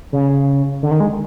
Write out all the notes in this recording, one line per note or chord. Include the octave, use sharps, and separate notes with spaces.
C#3
D3
D#3
G#3